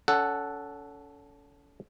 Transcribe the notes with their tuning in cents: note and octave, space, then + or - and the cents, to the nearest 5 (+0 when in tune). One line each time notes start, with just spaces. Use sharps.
C#4 +35 A4 +0 F#5 +0